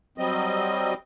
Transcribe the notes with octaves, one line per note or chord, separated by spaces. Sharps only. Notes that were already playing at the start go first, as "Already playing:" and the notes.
F#3 G3 C4 D#5